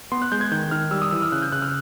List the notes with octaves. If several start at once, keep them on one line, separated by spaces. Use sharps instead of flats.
B3 C6
F#6
G#3 G6
G#6
D#3 G6
D#3 F6
G3 E6
D#6
E3 E6
F6
C#3 F#6
G6
C#3 F#6
F6